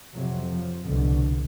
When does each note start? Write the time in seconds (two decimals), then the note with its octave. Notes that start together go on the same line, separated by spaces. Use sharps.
0.13 F2 C3 F#3
0.49 F3
0.86 C2 B2 D3